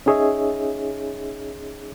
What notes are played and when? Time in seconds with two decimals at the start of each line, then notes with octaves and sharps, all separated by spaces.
0.06 C#4 D#4 G#4 C#5 D#5 E5